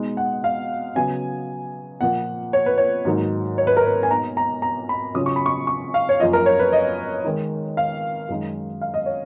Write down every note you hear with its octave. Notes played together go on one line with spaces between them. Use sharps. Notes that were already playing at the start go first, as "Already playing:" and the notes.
Already playing: B2 G#3 D#4
F#5
F5
C#3 F#3 B3 G#5
A#2 F3 A#3 F#5
C#5
B4
C#5
G#2 D#3 F#3 A#3 D#4
C#5
B4
A#4
B4
G#5
B2 A#3 D#4 A#5
A#5
A#5
B5
C#3 F#3 C#4 F4 D#6
C#6
B5
C#6
C#6
F5
C#5
F#2 F3 A#3 F4 D#5
A#4
C#5
B4
D#5
D#3 G#3 D#4
F5
F#2 D#3 G#3 D#4
F5
D#5
C#5